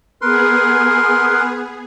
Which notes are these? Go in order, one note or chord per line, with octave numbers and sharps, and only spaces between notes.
B3 G#4 A#4 B4 C6